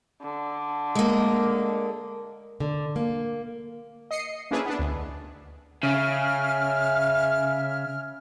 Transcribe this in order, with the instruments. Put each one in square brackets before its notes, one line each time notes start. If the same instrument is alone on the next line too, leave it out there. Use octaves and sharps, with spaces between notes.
[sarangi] D3
[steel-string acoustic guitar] G#3 A#3
D3
A#3
[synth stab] D#5 C7 C#7 D#7
A#3 C#4 D4 E4 G#4 B4
B3 D4
D2
[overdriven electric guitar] C#3 [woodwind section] E5 G#5 F6